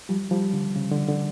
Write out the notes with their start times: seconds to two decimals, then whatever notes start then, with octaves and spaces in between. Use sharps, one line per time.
0.09 F3 G3
0.31 F3 G3
0.53 D3
0.76 C#3
0.92 D3
1.08 D3